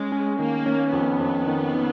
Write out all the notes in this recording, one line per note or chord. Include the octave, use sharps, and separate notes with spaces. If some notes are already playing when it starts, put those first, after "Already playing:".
Already playing: G#3 C#4
C#4
D#3 A#3
C#4
F2 B3
F2
D#3
D#3